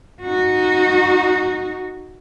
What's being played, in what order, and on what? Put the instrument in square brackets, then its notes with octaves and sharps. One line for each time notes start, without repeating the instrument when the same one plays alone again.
[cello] D#4 F#4